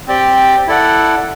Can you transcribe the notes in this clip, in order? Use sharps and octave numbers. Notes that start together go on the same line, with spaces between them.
C4 G4 D5 G5
E4 A4 D5 F#5